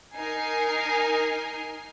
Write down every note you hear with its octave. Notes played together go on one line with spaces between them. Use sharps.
D#4 A#4 G#5 C7